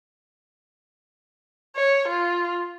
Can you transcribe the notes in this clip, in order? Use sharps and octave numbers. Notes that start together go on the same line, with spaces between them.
C#5
F4